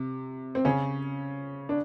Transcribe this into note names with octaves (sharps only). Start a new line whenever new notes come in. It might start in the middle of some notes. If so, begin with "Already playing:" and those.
Already playing: C3
C4
C#3 C#4
D4